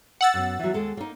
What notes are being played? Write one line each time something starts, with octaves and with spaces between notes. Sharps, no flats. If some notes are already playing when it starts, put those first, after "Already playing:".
F#5 E6 A6
F#2 B3
E3 F#3
D#2 G#3 A4
A#3 D#4